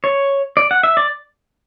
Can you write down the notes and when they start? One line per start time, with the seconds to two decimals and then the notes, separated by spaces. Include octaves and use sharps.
0.04 C#5
0.57 D5
0.71 F#5
0.83 E5
0.97 D5